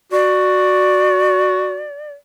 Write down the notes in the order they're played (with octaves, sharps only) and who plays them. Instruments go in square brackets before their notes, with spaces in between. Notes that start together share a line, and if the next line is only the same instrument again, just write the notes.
[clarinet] F#4 [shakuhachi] D5